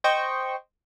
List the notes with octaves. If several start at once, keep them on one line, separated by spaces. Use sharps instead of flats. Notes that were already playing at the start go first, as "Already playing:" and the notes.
C5 D#5 G5 C#6